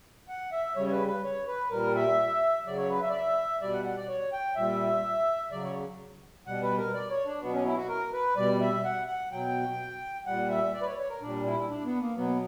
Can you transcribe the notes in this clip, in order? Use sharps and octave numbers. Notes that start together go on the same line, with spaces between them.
F#5
E5
C#3 G3 C#5
C#5
B4
B4
C#5
B4
A#2 G3 A#4
E5
C#3 F#3 D5
C#5
B4
E5
D5
E5
B2 G3 D5
F#5
F#5
D5
C#5
G5
A#2 G3 E5
C#3 F#3 D5
C#5
B2 G3 F#5
B4
A#4
D5
C#5
D4
B2 F#3 B3
C#4
E4
F#4
A#4
B4
B2 G3 D5
E5
F#5
F#5
B2 F#3 G5
A#2 G3 F#5
E5
D5
B4
C#5
C#5
A#4
A#2 G3 D4
E4
D4
B3
A#3
B2 F#3 B3